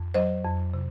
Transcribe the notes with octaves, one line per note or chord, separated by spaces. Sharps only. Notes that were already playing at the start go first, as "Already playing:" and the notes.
Already playing: F2
F#3 C5 D#5
F2
C3